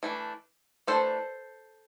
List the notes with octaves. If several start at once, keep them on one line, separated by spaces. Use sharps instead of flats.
E3 A3 D4
E3 A3 D4 A4 C5